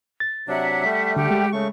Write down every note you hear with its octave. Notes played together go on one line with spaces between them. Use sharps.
A6
C3 F#3 D4 E5 F#5
G3 A3
D3 G4 F#5
G#3
C#3 A3 C#6